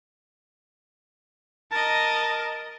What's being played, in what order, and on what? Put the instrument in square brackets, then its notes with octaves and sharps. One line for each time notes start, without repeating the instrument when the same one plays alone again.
[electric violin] A#4 D#5 [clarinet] A5